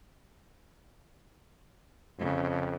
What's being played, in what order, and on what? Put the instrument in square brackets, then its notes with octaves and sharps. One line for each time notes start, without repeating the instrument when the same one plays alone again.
[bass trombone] F2 [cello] C#3